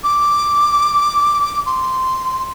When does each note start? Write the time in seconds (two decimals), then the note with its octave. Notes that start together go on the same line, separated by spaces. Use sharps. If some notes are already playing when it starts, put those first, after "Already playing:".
0.04 D6
1.66 C6